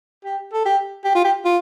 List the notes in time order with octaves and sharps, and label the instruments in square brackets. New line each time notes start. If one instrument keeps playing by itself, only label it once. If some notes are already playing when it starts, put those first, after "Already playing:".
[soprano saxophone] G4
A4
G4
G4
F4
G4
F4